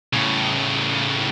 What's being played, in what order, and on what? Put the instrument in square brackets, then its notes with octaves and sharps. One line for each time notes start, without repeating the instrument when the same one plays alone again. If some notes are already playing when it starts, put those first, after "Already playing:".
[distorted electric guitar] A2 C#3